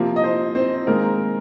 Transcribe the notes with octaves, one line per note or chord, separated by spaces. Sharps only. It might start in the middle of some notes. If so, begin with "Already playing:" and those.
Already playing: C3 F3 A#3
D#5
C4 C5
C4 C5
D#3 G#3 A#3 C4 A#4